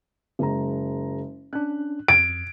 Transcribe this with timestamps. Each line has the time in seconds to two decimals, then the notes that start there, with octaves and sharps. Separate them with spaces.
0.39 F#1 G#3 A#5
1.53 C#4 D4 F#6
2.08 F2 G#6 D7